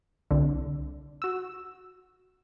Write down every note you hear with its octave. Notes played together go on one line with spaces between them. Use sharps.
C2 D3
F#4 E6